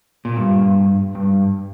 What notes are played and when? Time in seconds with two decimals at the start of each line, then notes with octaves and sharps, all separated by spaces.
0.25 A#2
0.37 G2
1.15 G2